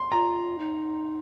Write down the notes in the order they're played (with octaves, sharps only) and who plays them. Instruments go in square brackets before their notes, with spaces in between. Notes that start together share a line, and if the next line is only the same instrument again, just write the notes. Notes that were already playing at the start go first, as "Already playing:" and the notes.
Already playing: [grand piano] C6
[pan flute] F4 [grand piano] A#5
[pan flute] D#4